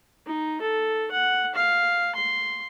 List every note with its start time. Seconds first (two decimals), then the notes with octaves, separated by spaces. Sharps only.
0.27 D#4
0.62 A4
1.12 F#5
1.55 F5
2.16 C6